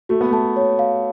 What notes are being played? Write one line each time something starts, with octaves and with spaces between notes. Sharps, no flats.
A3 F#4
B3
A3 A5
C#5
F5